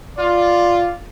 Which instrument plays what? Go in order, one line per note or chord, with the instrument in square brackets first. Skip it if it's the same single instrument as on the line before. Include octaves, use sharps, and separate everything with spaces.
[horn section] F4 [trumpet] D5